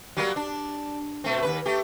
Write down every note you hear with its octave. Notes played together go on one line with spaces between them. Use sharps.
F#3 G3 A#3
D4
B2 A3 C4
D#2 C3 B4
A3 G4